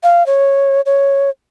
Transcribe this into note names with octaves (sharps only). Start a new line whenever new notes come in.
F5
C#5
C#5